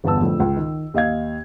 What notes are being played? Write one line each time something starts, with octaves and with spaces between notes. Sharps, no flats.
G1 E2 B3 A5 E6
F2 A2 D3
C#2
D#3
D#2 D#5 F5 G#6